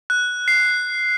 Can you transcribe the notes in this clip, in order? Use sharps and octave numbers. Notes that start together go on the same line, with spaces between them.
F#6
C7